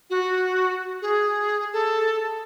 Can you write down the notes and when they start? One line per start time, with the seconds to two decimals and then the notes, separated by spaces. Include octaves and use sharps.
0.10 F#4
1.01 G#4
1.72 A4